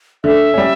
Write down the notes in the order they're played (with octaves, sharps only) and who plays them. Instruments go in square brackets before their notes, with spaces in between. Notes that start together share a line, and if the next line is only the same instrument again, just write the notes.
[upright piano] D3 [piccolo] E5
[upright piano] G3 C#4